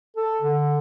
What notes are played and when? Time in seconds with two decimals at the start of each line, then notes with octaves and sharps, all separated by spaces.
0.16 A4
0.42 D3